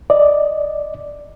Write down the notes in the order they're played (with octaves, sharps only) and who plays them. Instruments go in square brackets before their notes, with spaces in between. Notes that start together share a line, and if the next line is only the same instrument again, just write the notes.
[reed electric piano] D5 D#5